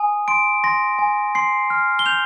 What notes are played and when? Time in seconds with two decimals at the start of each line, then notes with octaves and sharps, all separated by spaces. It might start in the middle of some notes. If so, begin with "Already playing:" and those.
Already playing: G#5 D#6
0.28 C6 D7
0.64 C6 A#6
0.99 G#5
1.35 C6 C7
1.70 F6
1.99 G7
2.06 G6 F7